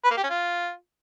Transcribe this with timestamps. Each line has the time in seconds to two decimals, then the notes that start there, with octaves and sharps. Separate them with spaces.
0.04 B4
0.11 A#3
0.17 G4
0.24 C#4
0.30 F4